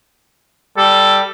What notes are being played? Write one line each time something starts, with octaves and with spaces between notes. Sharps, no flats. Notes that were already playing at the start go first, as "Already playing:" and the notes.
G3 A4